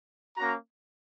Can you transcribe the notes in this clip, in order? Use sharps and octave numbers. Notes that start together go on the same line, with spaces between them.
A#3 C#4 F#4 A#5